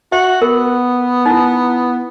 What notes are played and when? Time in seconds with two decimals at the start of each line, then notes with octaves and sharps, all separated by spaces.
0.12 F#4 E5
0.42 B3 A#4
1.26 D#4 E4